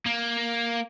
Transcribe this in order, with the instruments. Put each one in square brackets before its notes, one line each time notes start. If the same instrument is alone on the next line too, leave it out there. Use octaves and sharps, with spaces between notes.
[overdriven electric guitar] A#3